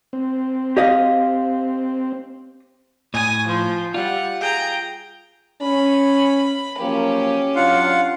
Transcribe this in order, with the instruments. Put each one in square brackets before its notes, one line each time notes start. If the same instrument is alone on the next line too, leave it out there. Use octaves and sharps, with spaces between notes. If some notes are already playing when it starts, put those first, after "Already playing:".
[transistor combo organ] C4
[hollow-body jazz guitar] G4 D#5 F5
[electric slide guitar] A2 [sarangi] G#5 [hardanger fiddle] D#6
[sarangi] F3 [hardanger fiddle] C5
[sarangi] G3 [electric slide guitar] F4 [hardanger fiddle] F#5
[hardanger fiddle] G#4 A#5 [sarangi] G5
[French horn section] C#4 [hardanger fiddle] B5
[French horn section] F3 F#3 A#3 [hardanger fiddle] C#4 G4
[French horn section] F#3 D4 [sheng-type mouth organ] F4 F5 F#5